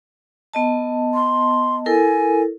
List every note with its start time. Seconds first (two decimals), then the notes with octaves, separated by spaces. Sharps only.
0.54 B3 D#5 A5
1.14 C6
1.86 E4 A4 A#4 G#5